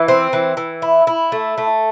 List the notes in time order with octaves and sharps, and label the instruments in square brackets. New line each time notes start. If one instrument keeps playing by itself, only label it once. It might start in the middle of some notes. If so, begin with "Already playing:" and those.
Already playing: [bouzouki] E3
C4
E3
E3
E4
E4
A3
A3